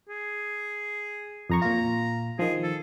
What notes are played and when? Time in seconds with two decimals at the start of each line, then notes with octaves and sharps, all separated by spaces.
0.09 G#4
1.50 F2 A#5 C#6
1.62 A#2 F4 A#5
2.39 D#3 F3 G#4
2.63 A4